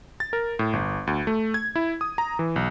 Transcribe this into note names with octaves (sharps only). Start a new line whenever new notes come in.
A6
A#4
A2
G1
D2
A3
G#6
E4
D#6
A#5
E3
B1